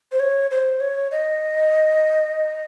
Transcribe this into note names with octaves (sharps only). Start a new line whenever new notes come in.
C5
C#5
C5
C#5
D#5